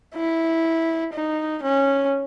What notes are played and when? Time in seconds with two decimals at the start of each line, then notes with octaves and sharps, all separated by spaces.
0.15 E4
1.14 D#4
1.63 C#4